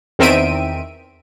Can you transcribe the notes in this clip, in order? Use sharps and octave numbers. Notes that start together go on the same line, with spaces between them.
E2 D#3 C4 E5 D7 D#7